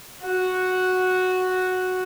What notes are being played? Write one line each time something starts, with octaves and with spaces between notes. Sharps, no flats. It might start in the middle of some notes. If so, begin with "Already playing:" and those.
F#4 F#5